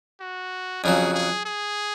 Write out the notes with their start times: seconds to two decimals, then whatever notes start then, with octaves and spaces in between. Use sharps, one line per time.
0.21 F#4
0.84 F2 C#3 F#3 G#4
1.14 G#4
1.46 G#4